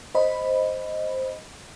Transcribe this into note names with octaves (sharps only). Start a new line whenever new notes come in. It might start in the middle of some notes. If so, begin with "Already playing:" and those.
C5 D#5 B5